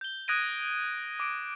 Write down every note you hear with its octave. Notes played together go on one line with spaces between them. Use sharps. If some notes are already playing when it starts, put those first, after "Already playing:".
G6 G7
D#6 F#6 G#6 A#6 D7 D#7
D6 D7